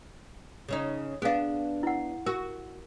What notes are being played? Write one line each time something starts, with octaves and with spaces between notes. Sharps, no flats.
C#3 C#4 D#4
B3 D4 G#4 F5
E4 F#5
F#4 A#4